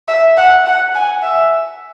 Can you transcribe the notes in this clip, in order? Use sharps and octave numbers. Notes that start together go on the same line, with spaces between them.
E5
F#5
F#5
G#5
E5